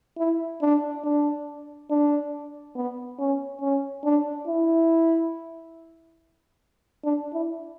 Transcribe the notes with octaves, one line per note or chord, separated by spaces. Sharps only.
E4
D4
D4
D4
B3
C#4
C#4
D4
E4
D4
E4